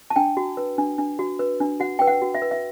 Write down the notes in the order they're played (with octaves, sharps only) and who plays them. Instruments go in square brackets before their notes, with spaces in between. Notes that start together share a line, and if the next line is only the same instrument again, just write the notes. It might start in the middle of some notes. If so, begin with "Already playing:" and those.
[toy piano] A5
D4 G5
F#4
B4
D4
D4
F#4
B4
D4
F#4 F#5
B4 G5
F#5
F#4
E5
B4
E5